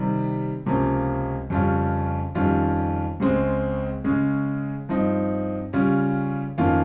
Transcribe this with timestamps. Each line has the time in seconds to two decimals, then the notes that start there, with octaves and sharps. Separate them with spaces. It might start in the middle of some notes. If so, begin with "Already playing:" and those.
Already playing: C3 D#3 G3
0.66 C#2 C3 F3 A#3 C#4
1.50 F2 C#3 G3 C#4 F4
2.35 F2 D#3 G3 C#4 F4
3.20 C#2 C#3 G#3 C4
4.04 C#3 G#3 C#4
4.89 G2 F3 C4 D#4
5.73 C#3 G3 C#4 F4
6.58 F2 D#3 A#3 C#4 F4